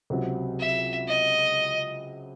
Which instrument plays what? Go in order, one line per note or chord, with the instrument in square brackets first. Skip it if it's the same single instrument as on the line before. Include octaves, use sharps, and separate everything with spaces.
[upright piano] C#2 C3 F#3
[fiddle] E5
D#5